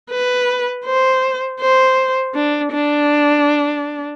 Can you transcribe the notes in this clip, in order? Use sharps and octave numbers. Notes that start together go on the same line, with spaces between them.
B4
C5
C5
D4
D4